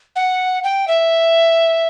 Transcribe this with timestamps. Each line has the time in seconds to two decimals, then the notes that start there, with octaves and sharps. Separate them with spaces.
0.16 F#5
0.64 G5
0.88 E5